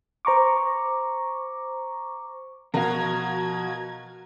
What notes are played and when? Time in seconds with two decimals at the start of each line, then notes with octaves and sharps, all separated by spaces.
0.25 C5 A#5 C#6 D6
2.74 B2 F3 F#4 A#4 F5 A#5 G#6